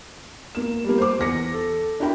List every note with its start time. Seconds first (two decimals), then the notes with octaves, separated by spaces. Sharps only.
0.55 A#3 E7
0.84 G3 A#3
0.98 C5 D6
1.19 E2 A#6 C#7
1.53 A4
2.00 D4 E4 F#4 A#4 G5 B5